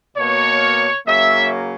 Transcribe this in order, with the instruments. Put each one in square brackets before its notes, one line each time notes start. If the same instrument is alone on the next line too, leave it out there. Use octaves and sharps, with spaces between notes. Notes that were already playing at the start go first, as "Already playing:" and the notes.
[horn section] B2 A#3 C#5
C#3 F#3 A#3 E5